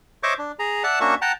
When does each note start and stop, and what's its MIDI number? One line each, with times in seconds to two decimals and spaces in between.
0.23 0.34 72
0.23 0.34 73
0.23 0.34 75
0.23 0.34 76
0.23 0.34 85
0.23 0.34 86
0.39 0.52 62
0.59 0.83 68
0.59 0.83 82
0.84 0.99 74
0.84 0.99 76
0.84 0.99 78
0.84 0.99 81
1.01 1.15 58
1.01 1.15 61
1.01 1.15 62
1.01 1.15 66
1.01 1.15 76
1.01 1.15 85
1.22 1.32 78
1.22 1.32 79
1.22 1.32 81
1.22 1.32 82